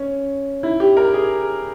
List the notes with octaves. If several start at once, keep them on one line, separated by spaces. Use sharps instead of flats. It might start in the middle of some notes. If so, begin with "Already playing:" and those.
Already playing: C#4
E4
G4
A#4
G#4